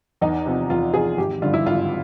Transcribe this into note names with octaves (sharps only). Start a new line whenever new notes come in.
E2 D#4
C3 F3
E2 F4
C3 F3 G#4
G#1 G4
G2 D3 F3 F4
E4
G#1 F4